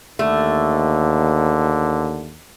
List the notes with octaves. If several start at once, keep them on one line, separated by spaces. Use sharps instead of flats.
D#2 D3 A3